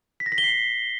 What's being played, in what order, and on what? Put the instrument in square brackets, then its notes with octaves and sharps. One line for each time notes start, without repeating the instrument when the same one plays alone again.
[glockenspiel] B6
A#6
B6
G7
C7